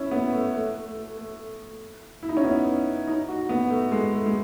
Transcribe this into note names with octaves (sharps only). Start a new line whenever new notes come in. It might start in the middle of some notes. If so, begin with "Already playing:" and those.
Already playing: C#4 E4
B3
A3
A3
A3
A3
E4
D#4
C#4
B3
D#4
F#4
B3
A3
G#3
A3
G#3